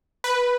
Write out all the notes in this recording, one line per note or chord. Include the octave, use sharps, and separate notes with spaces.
B4